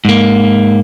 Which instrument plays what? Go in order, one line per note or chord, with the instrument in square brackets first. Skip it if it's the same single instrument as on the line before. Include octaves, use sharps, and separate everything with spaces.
[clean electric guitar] G#2 A#3